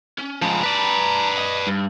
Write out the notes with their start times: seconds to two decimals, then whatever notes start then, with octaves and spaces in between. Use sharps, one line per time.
0.18 C#4
0.42 F3 G#3 A5 A#5
0.63 B4 D5
1.38 D#5
1.67 G2